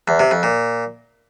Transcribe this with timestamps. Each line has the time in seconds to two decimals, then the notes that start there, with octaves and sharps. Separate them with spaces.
0.08 E2
0.19 C3
0.31 F2
0.43 A#2